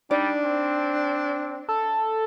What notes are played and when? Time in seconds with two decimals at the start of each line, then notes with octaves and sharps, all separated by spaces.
0.11 G3 D4 D#4 D5
0.44 C4
1.69 A4